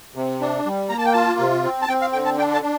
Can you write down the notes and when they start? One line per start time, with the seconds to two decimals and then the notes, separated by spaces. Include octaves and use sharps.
0.15 C3
0.41 D4
0.66 G3
0.89 A#3 A#5
0.98 A5
1.05 G5
1.13 F4 A5
1.39 C3
1.64 C4
1.82 A5
1.88 C4 G5
2.01 F5
2.13 D3 G5
2.25 A5
2.38 D4 G5
2.54 A5
2.62 D4